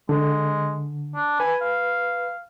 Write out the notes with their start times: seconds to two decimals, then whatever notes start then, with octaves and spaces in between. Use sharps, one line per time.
0.09 D3 G#3
1.15 D4
1.40 B4 G#5
1.61 F5